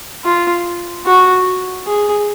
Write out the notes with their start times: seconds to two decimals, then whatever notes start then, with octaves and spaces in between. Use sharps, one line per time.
0.25 F4
1.06 F#4
1.87 G#4